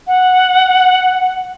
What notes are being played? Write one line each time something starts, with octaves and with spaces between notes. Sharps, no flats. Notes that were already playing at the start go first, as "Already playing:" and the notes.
F#5